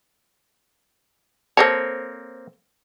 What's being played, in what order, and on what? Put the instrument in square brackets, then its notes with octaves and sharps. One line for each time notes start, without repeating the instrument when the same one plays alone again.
[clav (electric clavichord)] A#3 C4 C#5 [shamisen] A4 C5 A5